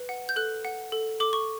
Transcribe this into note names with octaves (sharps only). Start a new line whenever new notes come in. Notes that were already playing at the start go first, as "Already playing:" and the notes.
Already playing: B4
F#5
G6
A4 F#6
F#5
A4
A4 D6
C#6